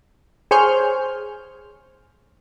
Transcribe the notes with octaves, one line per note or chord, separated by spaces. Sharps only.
G#4 C5 C#5 G#5 F6 G6